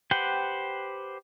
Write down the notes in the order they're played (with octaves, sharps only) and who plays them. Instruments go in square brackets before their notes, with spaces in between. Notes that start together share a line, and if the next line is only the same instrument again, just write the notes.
[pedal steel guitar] G4 B4 C5 F#5 G5